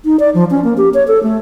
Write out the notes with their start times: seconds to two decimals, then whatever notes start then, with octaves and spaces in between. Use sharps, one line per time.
0.05 D#4
0.20 D5
0.34 F3
0.51 C#4
0.64 A#3
0.77 G4
0.94 C#5
1.08 A4
1.23 A3